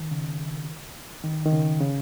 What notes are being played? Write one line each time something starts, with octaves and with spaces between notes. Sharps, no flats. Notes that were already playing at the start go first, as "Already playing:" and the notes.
Already playing: D#3
C#3
D#3
D#3
C#3
C#3